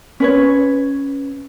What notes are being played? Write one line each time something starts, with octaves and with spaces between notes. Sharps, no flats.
C#4 B4 C#5